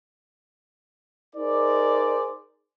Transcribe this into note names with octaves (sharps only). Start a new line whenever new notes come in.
D#4 G#4 A#4 C5 D5